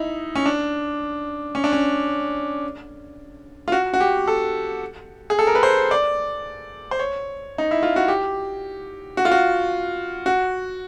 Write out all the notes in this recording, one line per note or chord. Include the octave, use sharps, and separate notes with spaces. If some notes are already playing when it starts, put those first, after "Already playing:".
Already playing: D#4 E4
C#4
D4
C#4
D4
C#4
F4
F#4
F#4
G4
A4
G#4
A4
A#4
B4
C5
D5
C5
C#5
D#4
E4
F4
F#4
G4
F#4
F4
F#4
F#4